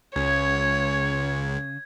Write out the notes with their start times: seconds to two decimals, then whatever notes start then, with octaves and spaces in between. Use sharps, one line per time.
0.16 C#2 C#3 C#5 G#6